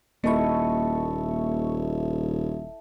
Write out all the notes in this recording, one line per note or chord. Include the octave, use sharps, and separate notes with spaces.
D#1 A#3 E4 A4 D#5 C#6